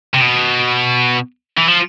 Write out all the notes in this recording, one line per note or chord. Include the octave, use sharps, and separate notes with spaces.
C3
B2
E3
F3